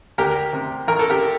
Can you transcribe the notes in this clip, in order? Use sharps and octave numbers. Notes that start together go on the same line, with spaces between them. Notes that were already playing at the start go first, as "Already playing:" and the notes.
D2 G4 A#4
C3
A1 A#4
A4
G4 A#4